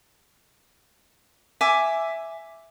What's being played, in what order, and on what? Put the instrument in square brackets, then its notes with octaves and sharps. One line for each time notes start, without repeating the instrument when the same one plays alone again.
[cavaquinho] E5 G#5 D6